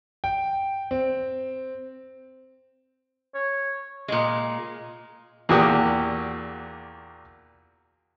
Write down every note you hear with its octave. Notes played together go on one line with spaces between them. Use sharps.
G5
C4
C#5
A#2 G#3
E2 A#2 F#4 G4 D#6